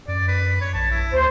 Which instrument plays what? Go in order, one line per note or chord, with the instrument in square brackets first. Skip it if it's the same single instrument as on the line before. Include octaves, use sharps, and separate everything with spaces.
[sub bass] F#2 [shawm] D5
[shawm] B4
C#5
[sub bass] A#1 [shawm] A5
[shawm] E4
[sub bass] D2 [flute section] C5